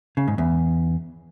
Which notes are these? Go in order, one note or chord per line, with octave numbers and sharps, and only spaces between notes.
C#3
G#2
E2